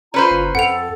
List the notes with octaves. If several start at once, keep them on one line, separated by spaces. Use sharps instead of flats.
C#4 F4 B4 C5 A#5
F#1
F2 A4 F#5 G5 F7